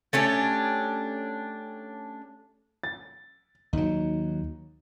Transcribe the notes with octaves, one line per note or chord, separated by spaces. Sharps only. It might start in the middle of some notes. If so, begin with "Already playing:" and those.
A3 C#4 D4 G4
A6
D#2 F#3 D#4